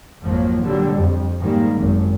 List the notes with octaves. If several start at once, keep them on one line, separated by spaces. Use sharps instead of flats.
G#1 F2 F3 F#3 A#3
A#2 D3 F#3 G3
F2
G#2 D#3 G3 A#3
G#1 F#2